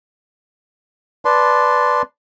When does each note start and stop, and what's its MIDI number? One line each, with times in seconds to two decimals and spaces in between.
1.25 2.02 71
1.25 2.02 74
1.25 2.02 81
1.25 2.02 84